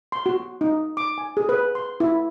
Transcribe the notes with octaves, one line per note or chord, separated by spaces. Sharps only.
C6
F#4
D#4
D6
G#5
G#4
B4
C6
E4